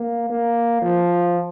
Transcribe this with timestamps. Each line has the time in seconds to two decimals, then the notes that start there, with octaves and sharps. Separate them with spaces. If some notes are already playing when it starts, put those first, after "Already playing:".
Already playing: A#3
0.30 A#3
0.82 F3